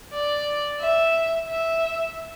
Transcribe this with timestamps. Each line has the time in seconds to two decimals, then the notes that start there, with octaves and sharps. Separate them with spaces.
0.13 D5
0.81 E5
1.48 E5